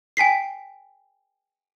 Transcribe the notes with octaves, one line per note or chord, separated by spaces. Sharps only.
G5 G#5 B6 C7